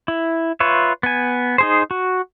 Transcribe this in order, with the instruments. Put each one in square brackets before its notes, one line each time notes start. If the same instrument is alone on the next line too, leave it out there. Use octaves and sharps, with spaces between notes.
[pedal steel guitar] E4
F4 B4 C#5 E5
B3 G#5
D#4 G#4 C5
F#4